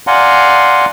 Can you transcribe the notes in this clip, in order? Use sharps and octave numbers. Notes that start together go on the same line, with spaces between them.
D5 F5 F#5 G#5 A#5 C6